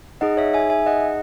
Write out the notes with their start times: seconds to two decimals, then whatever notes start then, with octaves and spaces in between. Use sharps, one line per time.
0.21 D#4 G#4 D#5 F#5
0.37 C#5 E5
0.54 E5 G#5
0.70 E5 G#5
0.86 D#5 F#5